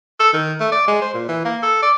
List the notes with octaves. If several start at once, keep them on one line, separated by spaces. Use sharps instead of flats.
A4
D#3
A3
D5
G#3
C5
A#2
E3
A#3
A4
D5